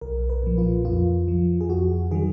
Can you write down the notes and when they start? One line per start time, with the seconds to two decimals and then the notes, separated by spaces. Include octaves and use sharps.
0.01 B1 A#4
0.30 B4
0.43 A#2 F3
0.58 F4
0.85 F2 F4
1.28 F3
1.61 G#4
1.69 F2 F#4
2.11 D#3 F#3 G#4